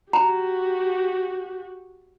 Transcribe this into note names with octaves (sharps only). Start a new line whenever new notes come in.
F#4 G4 A#5